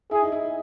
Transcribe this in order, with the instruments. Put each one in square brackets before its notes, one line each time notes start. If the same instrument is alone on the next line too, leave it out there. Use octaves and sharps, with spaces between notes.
[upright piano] E4 [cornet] G#4
[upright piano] D#4
E4